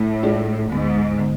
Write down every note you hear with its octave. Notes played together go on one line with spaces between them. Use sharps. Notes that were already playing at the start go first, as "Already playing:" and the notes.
Already playing: A2
G#3 D4 F4 G#4 D5
D2 G#2 D3 G#3 B3
D3 G#3 B3